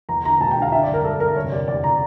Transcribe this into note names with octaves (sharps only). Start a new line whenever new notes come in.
E2 A#5
D3 A#5
E1 A5
G5
D3
F5
D3 E5
D5
G1
A#4
G1 A4
G1 A#4
F1 C#5
G3 D5
E2 D5
C#3 A#5